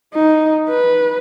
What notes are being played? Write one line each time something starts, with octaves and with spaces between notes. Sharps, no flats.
D#4
B4